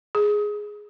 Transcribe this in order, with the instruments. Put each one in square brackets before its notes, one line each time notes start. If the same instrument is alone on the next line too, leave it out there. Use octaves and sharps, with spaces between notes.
[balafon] G#4